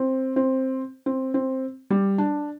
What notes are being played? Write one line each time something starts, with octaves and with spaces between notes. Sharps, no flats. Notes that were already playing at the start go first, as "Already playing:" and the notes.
Already playing: C4
C4
C4
C4
G3
D4